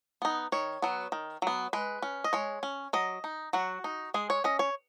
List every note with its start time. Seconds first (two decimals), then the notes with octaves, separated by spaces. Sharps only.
0.22 B3 D#4
0.52 D#3 C#5
0.82 F#3 B3
1.12 D#3
1.42 F#3 B3
1.73 G#3 B4
2.02 C#4
2.24 D#5
2.33 G#3 C#5
2.63 C#4
2.93 F#3 D#5
3.24 D#4
3.53 F#3 F#4
3.84 D#4
4.14 G#3 G#4
4.30 C#5
4.44 C#4 D#5
4.59 C#5